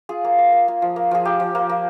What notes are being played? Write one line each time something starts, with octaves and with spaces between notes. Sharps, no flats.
F4 G#4
A#3
A#3
A#3
A#3
F3
A#3
F3 G#4
A#3 G4
F3
A#3
A#3